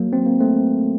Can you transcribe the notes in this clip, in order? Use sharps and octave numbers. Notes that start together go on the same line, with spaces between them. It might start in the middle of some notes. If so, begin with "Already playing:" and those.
Already playing: F#3 A#3
C4
A#3
A3 C4